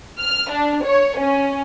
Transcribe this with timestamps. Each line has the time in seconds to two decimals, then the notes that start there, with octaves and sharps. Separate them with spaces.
0.20 F6
0.51 D4
0.85 C#5
1.19 C#4